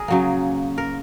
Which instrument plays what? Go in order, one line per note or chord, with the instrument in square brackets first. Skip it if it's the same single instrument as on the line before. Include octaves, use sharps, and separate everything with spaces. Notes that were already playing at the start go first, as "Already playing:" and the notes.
Already playing: [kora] G#4 A#4
C#3 F#3 A#3
A#4